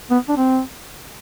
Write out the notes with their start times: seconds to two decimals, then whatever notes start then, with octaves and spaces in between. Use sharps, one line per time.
0.10 B3
0.29 D4
0.37 C4